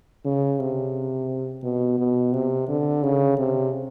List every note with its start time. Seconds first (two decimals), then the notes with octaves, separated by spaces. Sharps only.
0.25 C#3
0.59 C3
1.63 B2
1.99 B2
2.33 C3
2.68 D3
3.03 C#3
3.38 C3